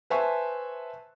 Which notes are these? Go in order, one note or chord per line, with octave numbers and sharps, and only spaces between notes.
B4 C5 E5 G#5 A5 C#6